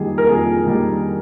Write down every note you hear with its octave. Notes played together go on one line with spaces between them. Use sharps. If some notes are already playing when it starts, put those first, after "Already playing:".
Already playing: F2 D#3 G3 G#4
A#4
F2 G#4
D#3 G3